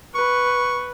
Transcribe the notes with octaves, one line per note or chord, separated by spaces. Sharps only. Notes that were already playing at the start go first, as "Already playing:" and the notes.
B4 C#6